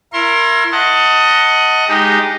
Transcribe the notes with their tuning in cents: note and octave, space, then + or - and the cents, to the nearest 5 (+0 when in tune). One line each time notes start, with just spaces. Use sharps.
E4 +30 A#4 +0 C6 +35
D#5 +15 F#5 +0 A5 +25
G#3 +0 D#4 -5 G4 +0